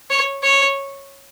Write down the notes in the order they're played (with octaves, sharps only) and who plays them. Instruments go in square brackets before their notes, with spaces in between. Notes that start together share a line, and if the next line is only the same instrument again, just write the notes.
[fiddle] C#5
C#5